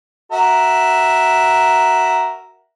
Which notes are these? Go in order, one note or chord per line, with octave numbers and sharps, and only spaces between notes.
F#4 A#4 E5